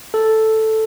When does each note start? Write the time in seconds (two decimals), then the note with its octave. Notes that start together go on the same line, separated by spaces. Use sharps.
0.14 A4